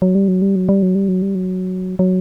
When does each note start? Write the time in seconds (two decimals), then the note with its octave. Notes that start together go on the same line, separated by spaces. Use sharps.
0.02 F#3
0.15 G3
0.28 F#3
0.42 G3
0.56 F#3
0.69 G3
0.82 F#3
0.95 G3
1.08 F#3
1.22 G3
1.35 F#3
1.99 F#3